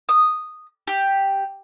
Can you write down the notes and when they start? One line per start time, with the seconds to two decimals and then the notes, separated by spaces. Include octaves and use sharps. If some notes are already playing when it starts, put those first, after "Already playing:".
0.09 D#6
0.87 G4